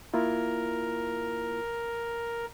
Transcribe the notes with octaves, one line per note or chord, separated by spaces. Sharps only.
A#3 E4 F4 A#4